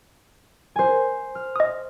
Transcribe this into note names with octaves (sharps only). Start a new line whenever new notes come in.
C5 G#5
F6
D#5 D#6